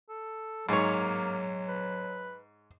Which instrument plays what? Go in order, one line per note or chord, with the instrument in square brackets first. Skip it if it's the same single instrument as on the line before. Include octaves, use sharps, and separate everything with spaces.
[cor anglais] A4
[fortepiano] G#2 C#5 [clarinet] F#3 [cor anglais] A#3
[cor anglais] B4